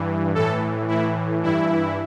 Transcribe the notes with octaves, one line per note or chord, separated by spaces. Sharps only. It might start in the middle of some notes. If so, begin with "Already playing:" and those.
Already playing: G2 E3
A2 E3 A4
A2 E3 E4
G2 E3 E4